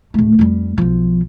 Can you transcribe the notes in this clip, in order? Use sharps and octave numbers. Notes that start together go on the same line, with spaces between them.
D1 A3
F2 G3
B1 F3